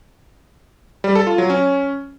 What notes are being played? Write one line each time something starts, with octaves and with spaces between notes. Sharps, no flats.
G3
A4
F4
F#3
C#4